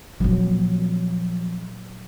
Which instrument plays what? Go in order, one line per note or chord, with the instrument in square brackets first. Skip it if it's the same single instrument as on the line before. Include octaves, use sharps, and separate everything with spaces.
[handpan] A#2 F#3 [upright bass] F3 C4